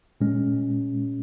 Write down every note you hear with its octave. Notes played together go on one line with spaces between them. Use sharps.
A#2 G#3 C#4